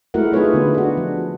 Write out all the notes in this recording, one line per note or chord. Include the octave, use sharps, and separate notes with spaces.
G#3 A3 E4 F#4 A#4 F#5
A3 D#4 F4 G#4 B4 C#5
D3 B3
D4 F#4
F3